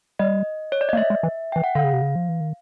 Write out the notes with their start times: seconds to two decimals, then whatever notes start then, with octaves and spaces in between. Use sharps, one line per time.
0.19 G3 D#5
0.72 C#5
0.81 D5
0.89 D#5
0.93 A#3
0.97 A3 E5
1.10 G#3
1.23 E3
1.52 E3 G5
1.64 F#5
1.75 D3 F5
1.84 C#3
1.93 C3
2.02 C#3
2.15 F3
2.29 E3
2.40 D#3